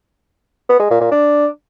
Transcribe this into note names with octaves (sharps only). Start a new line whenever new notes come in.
B3
G#3
A#2
A#2
D4